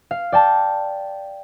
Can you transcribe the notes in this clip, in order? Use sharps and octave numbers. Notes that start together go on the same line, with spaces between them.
F5
D5 G5 A5